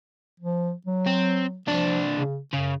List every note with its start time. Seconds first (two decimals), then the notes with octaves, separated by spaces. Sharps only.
0.40 F3
0.86 F#3
1.07 C4
1.67 C2 F3 D4
2.13 C#3
2.53 F#2 C#3